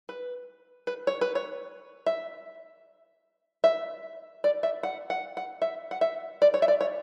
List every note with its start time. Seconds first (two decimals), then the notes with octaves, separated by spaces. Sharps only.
0.09 B4
0.87 B4
1.07 C#5
1.21 B4
1.35 C#5
2.06 E5
3.64 E5
4.44 D5
4.63 E5
4.83 F#5
5.10 F#5
5.37 F#5
5.62 E5
5.91 F#5
6.01 E5
6.42 D5
6.54 C#5
6.62 E5
6.68 D5
6.81 C#5